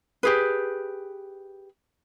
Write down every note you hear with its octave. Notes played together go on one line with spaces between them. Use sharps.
G4 G#4 B4